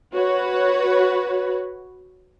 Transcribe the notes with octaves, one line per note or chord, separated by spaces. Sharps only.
F#4 B4 C#5